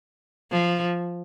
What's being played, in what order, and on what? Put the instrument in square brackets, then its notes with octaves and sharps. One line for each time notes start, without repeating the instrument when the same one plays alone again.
[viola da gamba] F3